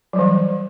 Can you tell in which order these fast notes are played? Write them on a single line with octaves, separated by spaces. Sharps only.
F#3 G3 E3